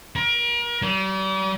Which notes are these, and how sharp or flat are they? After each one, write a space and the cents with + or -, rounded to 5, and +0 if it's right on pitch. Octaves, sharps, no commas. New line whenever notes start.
A#4 +35
G3 -40